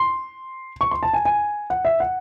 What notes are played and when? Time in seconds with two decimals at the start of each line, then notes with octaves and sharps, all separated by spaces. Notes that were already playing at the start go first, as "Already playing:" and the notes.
Already playing: C6
0.81 C#6
0.91 C6
1.03 A5
1.13 G#5
1.25 G#5
1.70 F#5
1.85 E5
2.00 F#5